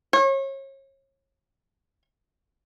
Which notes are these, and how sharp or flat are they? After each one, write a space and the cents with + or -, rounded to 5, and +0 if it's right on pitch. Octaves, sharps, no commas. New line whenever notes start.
C#5 -35